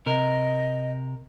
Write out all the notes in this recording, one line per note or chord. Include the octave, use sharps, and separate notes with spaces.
C3 A#4 D#5